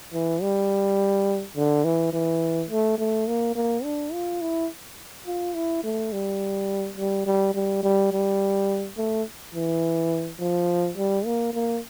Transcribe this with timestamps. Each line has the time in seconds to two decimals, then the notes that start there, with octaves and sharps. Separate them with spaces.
0.13 E3
0.42 G3
1.56 D3
1.84 E3
2.13 E3
2.70 A3
2.98 A3
3.27 A#3
3.55 A#3
3.84 D4
4.13 F4
4.41 E4
5.26 F4
5.55 E4
5.83 A3
6.12 G3
6.97 G3
7.26 G3
7.55 G3
7.83 G3
8.12 G3
8.97 A3
9.55 E3
10.39 F3
10.97 G3
11.25 A#3
11.54 A#3